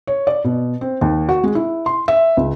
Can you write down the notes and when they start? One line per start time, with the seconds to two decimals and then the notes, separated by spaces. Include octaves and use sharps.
0.07 C#5
0.27 D5
0.44 B2
0.81 C4
1.01 D#2
1.29 F#4
1.44 G#3
1.55 E4
1.86 C6
2.08 E5
2.37 C#2